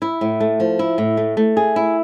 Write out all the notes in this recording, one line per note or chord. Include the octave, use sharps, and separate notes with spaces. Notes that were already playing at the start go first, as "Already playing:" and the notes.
E4
A2
A3
F3
E4
A2
A3
A3
G#4
E4